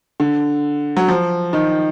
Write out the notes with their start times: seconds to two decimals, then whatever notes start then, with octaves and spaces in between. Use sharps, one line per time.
0.20 D3
0.97 F#3
1.08 F3
1.53 D#3